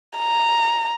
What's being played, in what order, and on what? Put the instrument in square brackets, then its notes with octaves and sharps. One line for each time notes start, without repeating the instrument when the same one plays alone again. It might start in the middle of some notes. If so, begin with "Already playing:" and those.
[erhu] A#5